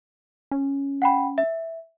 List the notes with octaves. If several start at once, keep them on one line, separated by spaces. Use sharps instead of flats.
C#4
F#5 G5 B5
E5